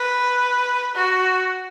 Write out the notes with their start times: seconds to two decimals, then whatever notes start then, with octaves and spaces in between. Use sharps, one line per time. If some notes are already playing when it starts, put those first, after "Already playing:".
Already playing: B4
0.95 F#4